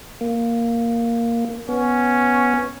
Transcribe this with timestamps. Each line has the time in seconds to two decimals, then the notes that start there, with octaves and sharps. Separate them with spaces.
0.21 A#3
1.69 B3 C#4